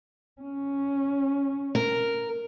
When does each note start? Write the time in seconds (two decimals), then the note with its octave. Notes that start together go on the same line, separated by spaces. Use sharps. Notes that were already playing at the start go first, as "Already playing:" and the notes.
0.41 C#4
1.75 A#4